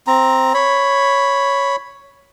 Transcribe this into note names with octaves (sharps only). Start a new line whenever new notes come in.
C4 A#5
C#5 B5